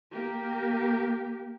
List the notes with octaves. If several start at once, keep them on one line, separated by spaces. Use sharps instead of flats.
A#3 G4